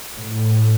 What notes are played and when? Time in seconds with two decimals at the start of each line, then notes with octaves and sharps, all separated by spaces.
0.16 A2